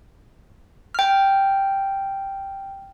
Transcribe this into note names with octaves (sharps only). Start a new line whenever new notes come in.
G5 F6